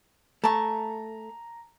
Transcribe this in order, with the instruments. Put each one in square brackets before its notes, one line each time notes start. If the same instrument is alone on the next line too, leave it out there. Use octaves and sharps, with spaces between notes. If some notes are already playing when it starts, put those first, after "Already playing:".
[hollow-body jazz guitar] A3 [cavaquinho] A5 C#6 [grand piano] A#5